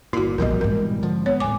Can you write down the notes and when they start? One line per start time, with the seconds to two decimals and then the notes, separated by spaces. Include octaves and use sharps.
0.13 G1 A#2 E4 F#4
0.38 A#1 F2 B2 E3 G3 A#4 D#5
0.61 G#1 G#2 A#4
1.03 D3 F3
1.26 B3 C#5
1.40 D#1 A2 G#5 D6